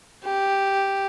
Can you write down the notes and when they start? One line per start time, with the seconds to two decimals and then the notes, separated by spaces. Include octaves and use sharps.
0.25 G4